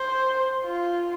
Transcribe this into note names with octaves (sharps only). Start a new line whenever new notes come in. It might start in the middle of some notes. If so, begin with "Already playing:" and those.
Already playing: C5
F4